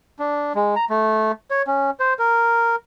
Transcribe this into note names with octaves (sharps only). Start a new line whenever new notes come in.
D4
G#3
A#5
A3
C#5
C#4
C5
A#4